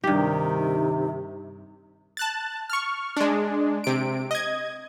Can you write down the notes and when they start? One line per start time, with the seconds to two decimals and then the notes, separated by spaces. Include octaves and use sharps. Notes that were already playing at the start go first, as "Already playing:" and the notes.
0.04 G2 C3 D#3 D#4 G4
2.17 A5 F#6 A6
2.70 C#6 F6
3.17 G#3 D4
3.84 C3 D7
4.31 D#5 G#6